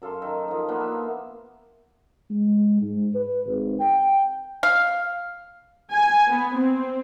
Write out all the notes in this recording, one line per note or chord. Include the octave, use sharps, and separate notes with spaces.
F#2 A4 F5 C6
D#3 A4
F3 D#5
F3 A#3 B3 D4
E5
F4
G#3
G#2
B4
G#1
G5
F5
G#5
B3
C4